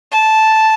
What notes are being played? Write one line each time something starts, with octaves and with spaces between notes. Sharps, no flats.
A5